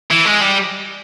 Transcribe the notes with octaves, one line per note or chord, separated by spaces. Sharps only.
E3
G#3
G3